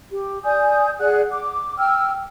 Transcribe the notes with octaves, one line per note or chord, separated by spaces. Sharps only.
G4
D5 G#5 D#6 G6
G#4 D5 F#5 F#6
D6
G5 E6 F6